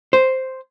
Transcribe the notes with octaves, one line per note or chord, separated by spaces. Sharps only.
C5